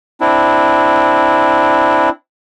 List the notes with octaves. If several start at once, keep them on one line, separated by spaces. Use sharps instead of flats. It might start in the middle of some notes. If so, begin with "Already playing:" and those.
C4 D4 E4